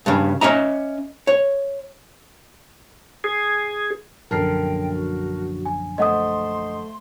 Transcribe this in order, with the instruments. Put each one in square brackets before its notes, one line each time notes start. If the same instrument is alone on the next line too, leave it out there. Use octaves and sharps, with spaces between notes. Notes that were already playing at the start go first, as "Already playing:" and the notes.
[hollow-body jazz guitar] G2 C#3
C#4 D#5 E5 A#5
C#5
[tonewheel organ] G#4
[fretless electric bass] A#1 F#2 D3 [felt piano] A#4 A5 C7 [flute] G5
[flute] F#4
[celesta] G#5
[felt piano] A3 C5 [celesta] D#5 F#5 D#6 [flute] C6